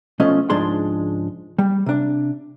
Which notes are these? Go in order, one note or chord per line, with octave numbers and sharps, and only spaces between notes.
B1 F3 A3 C#4 D#5
C#2 G#2 F3 G#3 D4 C6
G3
C3 D4